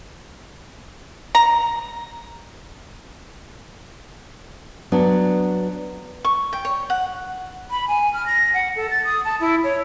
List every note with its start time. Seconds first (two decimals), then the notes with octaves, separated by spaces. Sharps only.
1.35 A#5
4.92 F#3 B3 D4
6.25 C#6
6.53 G5
6.65 C#5
6.90 F#5
7.70 B5
7.88 G#5
8.13 F6
8.26 A#6
8.53 F#5
8.76 A4
8.90 A6
9.04 D#6
9.25 A5
9.40 E4
9.64 C#5